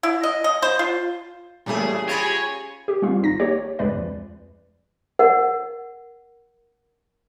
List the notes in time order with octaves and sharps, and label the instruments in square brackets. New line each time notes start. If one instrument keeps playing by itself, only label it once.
[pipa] E4
D#5
D#5
C5
F4
[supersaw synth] A#2 G3 A3 [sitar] C#3 E3 G#4
[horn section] F4 G4 G#5 [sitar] G#4 [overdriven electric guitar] C#5 [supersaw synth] B5 A#6 D7
[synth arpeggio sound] G4
G3 C4 F4
G#1 D#4 A#6
A#3 G4 C#5
D2 G#3 B4 D5
F2
[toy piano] A#4 F#5